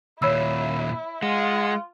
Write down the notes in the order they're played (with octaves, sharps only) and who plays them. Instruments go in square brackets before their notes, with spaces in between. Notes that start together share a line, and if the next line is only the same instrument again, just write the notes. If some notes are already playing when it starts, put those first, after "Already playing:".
[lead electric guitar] D#2 A#2 [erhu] E4 [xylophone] C#5 B5 E6
[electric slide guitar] G#3 [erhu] F4 [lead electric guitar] F#5